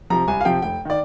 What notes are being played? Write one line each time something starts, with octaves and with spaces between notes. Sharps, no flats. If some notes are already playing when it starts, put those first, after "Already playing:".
C3 F3 A#5
C2 G#5
F5
C3 F3 G5
F1 G5
D#3 D5